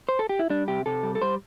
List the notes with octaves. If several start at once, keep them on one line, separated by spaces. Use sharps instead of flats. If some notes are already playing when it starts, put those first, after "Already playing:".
C5
A4
G4
E4
G3 D4
C3 G4
C3 A4
G3
A4
G3 C5